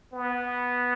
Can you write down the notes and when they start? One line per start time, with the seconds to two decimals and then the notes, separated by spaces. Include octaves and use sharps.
0.13 B3